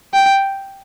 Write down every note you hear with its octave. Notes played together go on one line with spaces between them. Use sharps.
G5